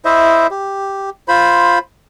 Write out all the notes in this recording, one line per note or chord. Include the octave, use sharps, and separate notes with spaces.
E4 C5 D#5 E5
G4
F4 C5 B5